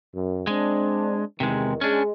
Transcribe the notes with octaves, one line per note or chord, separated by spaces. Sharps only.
F#2
G#3 C4 D4
E2 C3 D#3 G#3
G#3 C#4 D4